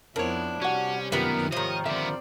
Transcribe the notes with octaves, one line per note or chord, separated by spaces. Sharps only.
F2 B3 D4 E4 A#4 C5 C#5
C3 G3 C#4 F#4 F#5
F#2 D#3 B3 F4 G4 A#4 E5
G#2 C3 D#3 F3 C#5 D#5
D3 B3 C4 D5 E5